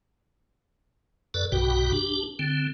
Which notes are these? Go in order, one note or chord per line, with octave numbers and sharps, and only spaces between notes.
F#2 A4 B4 D5
B1 G2 B2 F#4 G5
D4 G4
D3 C4